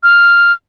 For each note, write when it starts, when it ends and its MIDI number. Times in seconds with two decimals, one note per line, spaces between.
0.03 0.52 89